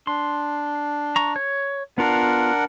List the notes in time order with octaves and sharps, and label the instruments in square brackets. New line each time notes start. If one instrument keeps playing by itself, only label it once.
[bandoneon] D4 [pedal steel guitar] C6
[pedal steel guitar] A#5 C#6
C#5
[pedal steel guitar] B3 F4 F5 [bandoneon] D4 A#4 F#5